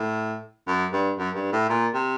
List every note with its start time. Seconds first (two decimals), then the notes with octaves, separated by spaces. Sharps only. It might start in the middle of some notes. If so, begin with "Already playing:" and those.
Already playing: A2
0.67 F#2
0.93 G2
1.18 F#2
1.35 G2
1.52 A2
1.69 A#2
1.94 C3